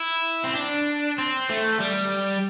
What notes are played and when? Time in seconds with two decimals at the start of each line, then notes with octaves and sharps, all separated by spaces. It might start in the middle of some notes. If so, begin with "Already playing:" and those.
Already playing: E4
0.44 C4
0.55 D4
1.18 C4
1.50 A3
1.80 G3